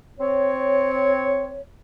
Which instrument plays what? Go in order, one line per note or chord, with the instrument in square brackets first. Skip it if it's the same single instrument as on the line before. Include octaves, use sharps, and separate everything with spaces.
[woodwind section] C4 C#5